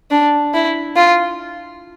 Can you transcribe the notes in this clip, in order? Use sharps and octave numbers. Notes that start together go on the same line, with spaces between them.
D4
E4
F4